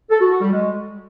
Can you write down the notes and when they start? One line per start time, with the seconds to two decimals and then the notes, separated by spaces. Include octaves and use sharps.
0.10 A4
0.21 F#4
0.31 F#4
0.41 G3
0.52 G#3